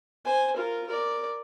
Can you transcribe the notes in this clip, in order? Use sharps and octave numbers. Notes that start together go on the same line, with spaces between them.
C5 G#5
F4 A#4
A#4 D5